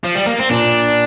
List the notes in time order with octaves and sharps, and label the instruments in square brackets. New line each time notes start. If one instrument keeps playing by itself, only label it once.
[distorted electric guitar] F3
G3
A#3
C4
[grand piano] A#2 [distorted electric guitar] D4